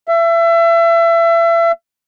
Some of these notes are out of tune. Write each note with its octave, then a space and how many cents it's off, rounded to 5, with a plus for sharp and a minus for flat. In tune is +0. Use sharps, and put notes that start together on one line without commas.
E5 +30